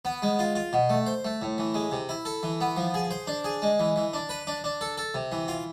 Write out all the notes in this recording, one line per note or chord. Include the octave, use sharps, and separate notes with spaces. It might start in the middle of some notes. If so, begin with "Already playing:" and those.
B3
G#3
F4
F4
B2
A3
C5
A3
A2
E3
G#3
C3
E4
A4
E3
B3
F3
G#4
C5
D4
G#4
G#3
E3
E3
D4
B4
D4
D4
A4
A4
C3
E3
F4